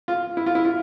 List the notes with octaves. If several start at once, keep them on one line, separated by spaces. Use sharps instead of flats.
F4
E4
F4
E4
F4